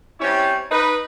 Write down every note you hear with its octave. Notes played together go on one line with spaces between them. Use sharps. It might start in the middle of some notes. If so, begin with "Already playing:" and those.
G3 C4 C#4 E4 G4 C#5
D#4 B4